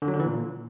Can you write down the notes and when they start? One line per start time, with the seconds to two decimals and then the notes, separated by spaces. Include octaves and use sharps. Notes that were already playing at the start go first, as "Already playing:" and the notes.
0.02 D3
0.08 F#3
0.14 D3
0.20 E3
0.25 A#2